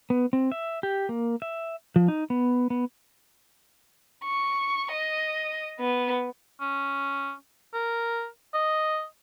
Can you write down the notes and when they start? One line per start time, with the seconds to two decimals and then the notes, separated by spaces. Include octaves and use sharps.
0.10 B3
0.33 C4
0.52 E5
0.83 G4
1.09 A#3
1.42 E5
1.96 F3
2.08 D#4
2.30 B3
2.70 B3
4.25 C#6
4.92 D#5
5.80 B3
6.61 C#4
7.74 A#4
8.54 D#5